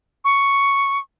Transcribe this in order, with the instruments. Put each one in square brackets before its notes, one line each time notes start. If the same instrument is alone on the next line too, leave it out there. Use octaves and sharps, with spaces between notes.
[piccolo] C#6